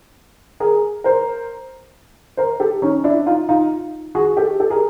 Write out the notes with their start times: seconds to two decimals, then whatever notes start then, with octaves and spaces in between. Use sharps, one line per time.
0.60 G#4 A#4
1.04 A#4 C5
2.37 A#4 C5
2.60 G4 A4
2.82 C#4 D#4
3.04 D4 E4
3.26 D#4 F4
3.49 D#4 F4
4.15 F#4 G#4
4.37 G4 A4
4.60 G4 A4
4.70 G#4 A#4